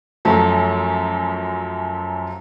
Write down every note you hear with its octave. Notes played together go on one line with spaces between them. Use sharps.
F#2 F3 F#3 A3